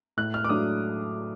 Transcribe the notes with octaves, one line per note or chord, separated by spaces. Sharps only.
A2 F#6
F6
D6
F#3 A3 D4 D#6